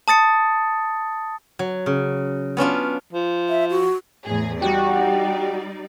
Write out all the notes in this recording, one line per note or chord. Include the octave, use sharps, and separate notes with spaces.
A5 D#6 A6 C#7
F#3
C#3
B3 C#4 D4 F4
F3
E5
F#4
E2 A2 G#4
G3 D#4 F#4 G4 D5